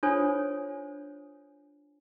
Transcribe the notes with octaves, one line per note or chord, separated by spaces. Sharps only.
D4 F4 A4 C5 C#5 G#5